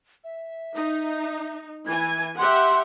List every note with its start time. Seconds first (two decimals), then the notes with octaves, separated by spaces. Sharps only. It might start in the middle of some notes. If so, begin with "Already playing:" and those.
0.24 E5
0.75 D#4
1.87 E3 G#5 G#6
2.38 G4 E5 F#5 C6